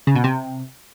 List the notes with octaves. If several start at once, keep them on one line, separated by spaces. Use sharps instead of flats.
C#3
B2
C3